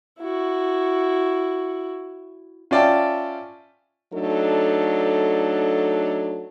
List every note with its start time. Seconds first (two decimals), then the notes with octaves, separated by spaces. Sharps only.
0.19 E4 F#4
2.71 C#4 F4 D5 E5 G5 A5
4.13 F#3 A3 D4 D#4 A4